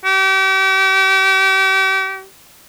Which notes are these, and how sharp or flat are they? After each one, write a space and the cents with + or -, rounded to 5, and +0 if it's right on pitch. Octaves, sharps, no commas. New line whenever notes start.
G4 -40